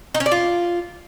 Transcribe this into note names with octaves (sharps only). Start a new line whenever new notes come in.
D#4
C#4
D5
F4